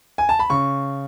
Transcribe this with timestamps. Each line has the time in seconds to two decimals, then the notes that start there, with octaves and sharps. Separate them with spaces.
0.18 G#5
0.29 A5
0.39 B5
0.50 C#3 C#6